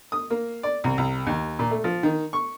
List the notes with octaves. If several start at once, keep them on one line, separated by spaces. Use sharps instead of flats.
D#6
A#3
D5
C2
C2
D#2
A#2
A3
F3
D#3
C#6